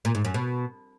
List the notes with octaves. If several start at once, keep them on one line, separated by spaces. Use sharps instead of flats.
A#2
G#2
F#2
B2